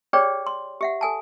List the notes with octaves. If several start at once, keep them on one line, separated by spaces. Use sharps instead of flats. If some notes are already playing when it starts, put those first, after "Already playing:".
G4 G#4 B4 C#5 D5 G5
C6
G4 E5 F#5
A4 G#5 A5